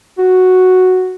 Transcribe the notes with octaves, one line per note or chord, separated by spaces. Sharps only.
F#4